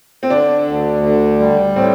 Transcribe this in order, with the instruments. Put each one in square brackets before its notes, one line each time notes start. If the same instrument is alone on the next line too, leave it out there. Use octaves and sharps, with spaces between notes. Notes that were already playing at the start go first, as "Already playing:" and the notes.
[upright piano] C4
[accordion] D3 [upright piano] D4
[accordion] D2
D3
G3
[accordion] A2 [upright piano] C4